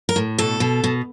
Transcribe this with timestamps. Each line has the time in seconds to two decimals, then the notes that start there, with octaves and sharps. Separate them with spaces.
0.09 A#4
0.16 A2
0.38 B2 A4
0.60 B2
0.84 B2